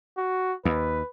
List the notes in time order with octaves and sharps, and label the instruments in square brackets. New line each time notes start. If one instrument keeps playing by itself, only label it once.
[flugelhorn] F#4
[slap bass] D#2 [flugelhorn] B4